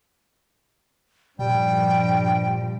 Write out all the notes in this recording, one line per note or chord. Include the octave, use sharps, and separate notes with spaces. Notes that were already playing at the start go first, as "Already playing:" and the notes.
G2 A#2 F3 G3 G5